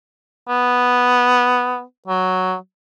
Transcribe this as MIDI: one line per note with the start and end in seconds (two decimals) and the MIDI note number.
0.49 1.83 59
2.07 2.55 54